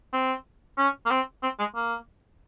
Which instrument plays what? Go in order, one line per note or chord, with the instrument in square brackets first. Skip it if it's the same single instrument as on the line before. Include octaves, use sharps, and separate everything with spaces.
[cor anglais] C4
C#4
A#3
C4
C4
G#3
A#3